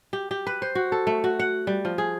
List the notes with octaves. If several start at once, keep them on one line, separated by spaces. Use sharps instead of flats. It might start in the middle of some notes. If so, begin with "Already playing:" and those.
G4
G4
B4
C5
F#4
A4
A3
F#4
F#5
G3
F3
G#4